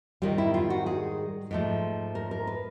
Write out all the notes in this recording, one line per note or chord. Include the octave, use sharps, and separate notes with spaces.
G#2 D#3 G3 F4
E4
F4
F#4
G#4
G#2 F3 A3
A#4
A#4
B4